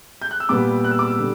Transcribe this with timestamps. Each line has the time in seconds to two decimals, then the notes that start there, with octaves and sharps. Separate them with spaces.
0.22 G6
0.31 F#6
0.40 E6
0.49 A#2 G3 B3 D6
0.84 F#6
0.91 E6
0.99 D6
1.07 E6
1.19 D3 G3